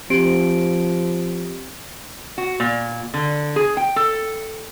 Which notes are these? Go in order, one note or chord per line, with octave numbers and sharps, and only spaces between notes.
F3 C4 G4 D7
F#4
A#2
D3
G#4
G5
A4